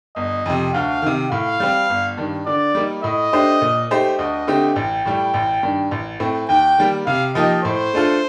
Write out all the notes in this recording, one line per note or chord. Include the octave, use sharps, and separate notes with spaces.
G1 D#5
F2 C3
D2 F5
C3 D#3
A2 F5
G3 C4
G1
G2 D#3
D3 D5
G3 A#3 D#4
A2 D#5
A3 D4 G4 C5
A#2
A3 D#4 G4 C5
D2 D#5
D3 A3 C4 G4
A1 G5
A2 G3
A1
G2 D#3
A1
A2 A3 C4
D#2 G5
D#3 G3 A#3
C3 F5
F3 A#3 D#4 G4 D#5
A2 C5
A3 D4 F4 A4